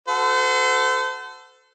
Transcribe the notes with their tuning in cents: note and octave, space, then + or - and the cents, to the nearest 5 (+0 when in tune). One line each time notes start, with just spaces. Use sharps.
F#4 +0 A4 +5 C5 -35